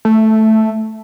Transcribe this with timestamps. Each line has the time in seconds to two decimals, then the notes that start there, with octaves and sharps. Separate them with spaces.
0.05 A3